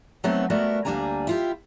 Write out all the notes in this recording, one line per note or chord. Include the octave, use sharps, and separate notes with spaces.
F#3 A3 B3 C4 D#4
G3 A3 B3 F#4 A#4
D2 G3 A#3 D4 G#5 A#5
E4 F4 G4